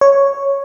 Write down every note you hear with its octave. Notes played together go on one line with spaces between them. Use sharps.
C#5